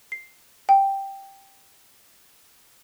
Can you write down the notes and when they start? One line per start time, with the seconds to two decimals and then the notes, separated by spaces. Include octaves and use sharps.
0.12 C7
0.69 G5